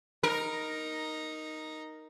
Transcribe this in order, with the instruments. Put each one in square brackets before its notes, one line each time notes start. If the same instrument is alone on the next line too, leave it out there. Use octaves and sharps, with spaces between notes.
[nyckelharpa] D#4 A#5 [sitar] A#4